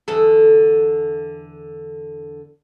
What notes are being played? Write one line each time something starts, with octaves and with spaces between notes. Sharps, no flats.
E2 D3 A4